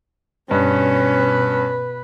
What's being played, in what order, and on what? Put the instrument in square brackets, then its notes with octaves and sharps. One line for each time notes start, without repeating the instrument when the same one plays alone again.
[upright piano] G2 [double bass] B2 [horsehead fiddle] C#4 [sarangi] B4